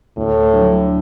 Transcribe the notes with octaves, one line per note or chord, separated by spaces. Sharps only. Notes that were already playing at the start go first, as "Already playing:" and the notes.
D2 A2
D3 F#3 A3 D4